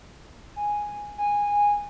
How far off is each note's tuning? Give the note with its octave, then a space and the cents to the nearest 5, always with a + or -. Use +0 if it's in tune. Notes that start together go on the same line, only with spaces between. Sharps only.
G#5 -5
G#5 -15